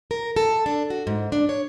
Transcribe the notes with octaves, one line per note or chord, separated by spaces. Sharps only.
A#4
A4
D4
F#4
G#2
D4
C#5